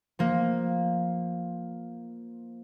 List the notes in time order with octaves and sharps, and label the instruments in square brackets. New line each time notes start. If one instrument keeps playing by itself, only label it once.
[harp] F3 A#3